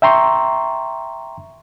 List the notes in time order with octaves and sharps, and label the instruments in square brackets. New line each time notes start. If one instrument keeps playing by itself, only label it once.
[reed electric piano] E5 G5 A#5 C6 C#6